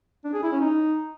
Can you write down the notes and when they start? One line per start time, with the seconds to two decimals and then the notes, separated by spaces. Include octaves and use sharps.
0.25 D4
0.34 G#4
0.43 E4
0.52 C#4
0.61 D#4